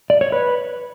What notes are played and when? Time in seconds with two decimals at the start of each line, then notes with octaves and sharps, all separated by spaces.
0.10 D5
0.21 C#5
0.32 B4